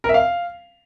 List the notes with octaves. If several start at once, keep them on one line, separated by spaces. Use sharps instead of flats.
A#4
E5
F5